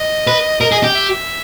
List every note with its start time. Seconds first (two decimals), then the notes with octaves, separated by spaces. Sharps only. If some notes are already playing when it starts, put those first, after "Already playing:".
Already playing: D#5
0.27 B4
0.61 A#4 D#5
0.72 G#4
0.78 D#5
0.84 G4
0.90 G5
0.95 E5